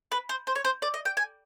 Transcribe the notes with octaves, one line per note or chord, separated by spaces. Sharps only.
B4
C5
C5
C#5
C5
D5
D#5
G5
G#5